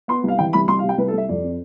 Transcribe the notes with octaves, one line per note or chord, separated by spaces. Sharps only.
B3 C6
C2
F5
E3 G5
C2 B5
C2 C6
F5
C3
G5
C2 B4
A4
C2 E5
F2 D5
C4